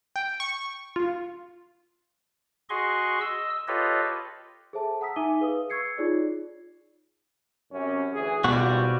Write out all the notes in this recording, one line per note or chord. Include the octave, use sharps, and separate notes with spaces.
G5
C#6
F4
F#4 G#4 D#5 C6 C#6
D#5 E6
F4 G4 A4 B4 C#5 D#5
G#4 A4 C5 E5 A5
F#5 A#5 D#6 E6 B6
D#4 E5 G#5 D6 D#7 G7
G#4 B4 F5 D#6
C#6 E6 G#6 C7 C#7
D#4 F4 G#4 C#5 D5
F#2 C3 C#4
D2 E3 G#4
G#1 B2 G3 F4 F#4